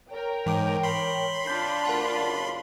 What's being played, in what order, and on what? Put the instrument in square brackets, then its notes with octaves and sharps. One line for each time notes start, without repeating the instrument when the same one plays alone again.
[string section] A#4 G5 [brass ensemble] C#5
[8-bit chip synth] G#2 [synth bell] E3 D6 D7 [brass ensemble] C#5
[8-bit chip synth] B5 C6
[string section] D4 F4 [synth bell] G6 B6
[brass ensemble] D2 [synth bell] A#4 F#5 A5
[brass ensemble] F#1 B1 C#5